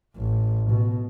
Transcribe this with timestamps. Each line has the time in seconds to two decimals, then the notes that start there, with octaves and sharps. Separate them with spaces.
0.16 A1
0.70 B2